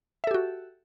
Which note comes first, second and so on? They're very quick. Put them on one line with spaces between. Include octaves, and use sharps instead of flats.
E5 A4 G4 F#4